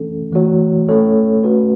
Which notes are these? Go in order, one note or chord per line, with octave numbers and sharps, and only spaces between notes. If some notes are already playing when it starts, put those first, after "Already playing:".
Already playing: E3 A3 C#4 A4
E3 A3 F#4 C#5
A3 C#4 A4 C#5
A3 C#4 F#4 B4